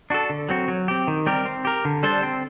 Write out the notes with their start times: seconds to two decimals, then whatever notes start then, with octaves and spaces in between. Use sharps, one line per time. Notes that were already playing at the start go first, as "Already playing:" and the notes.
0.10 D4 F#4 A4
0.30 D3
0.49 F#3 C4 F#4
0.68 F#3
0.88 C4 G4
1.08 D#3
1.26 G3 C4 G4 A#4
1.45 C4
1.65 G4 A#4
1.85 D3
2.03 G3 D4 A4 C5
2.23 C4